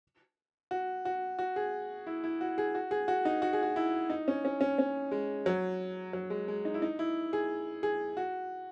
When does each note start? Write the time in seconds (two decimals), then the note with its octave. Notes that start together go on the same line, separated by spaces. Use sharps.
0.71 F#4
1.05 F#4
1.39 F#4
1.56 G#4
2.07 E4
2.24 E4
2.41 F#4
2.58 G#4
2.75 F#4
2.91 G#4
3.08 F#4
3.25 D#4
3.42 F#4
3.53 G#4
3.63 F#4
3.76 E4
4.10 D#4
4.28 C#4
4.45 C#4
4.61 C#4
4.79 C#4
5.12 G#3
5.46 F#3
6.13 F#3
6.30 G#3
6.48 G#3
6.65 D#4
6.74 E4
6.82 D#4
6.99 E4
7.33 G#4
7.83 G#4
8.17 F#4